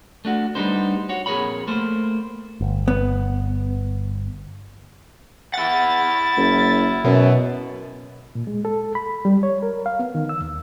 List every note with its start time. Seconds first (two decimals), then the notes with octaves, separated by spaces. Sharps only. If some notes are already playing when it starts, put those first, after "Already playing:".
0.25 A3 D4 F#4
0.55 G3 B3 D4 D#4 C5
1.09 F#4 C#5
1.26 F2 A#2 G#4 A#4 C#5 B5
1.68 A3 A#3 C5
2.61 G1
2.88 B3
5.54 E4 F#5 A6
6.37 F#1
7.04 F#2 B2
8.35 A#2
8.47 G#3
8.65 A4
8.95 B5
9.25 G3
9.43 C#5
9.63 A#4
9.86 F5
9.99 B3
10.15 D#3
10.29 E6
10.41 D#2